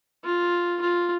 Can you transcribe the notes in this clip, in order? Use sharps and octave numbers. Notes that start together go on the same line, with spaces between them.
F4
F4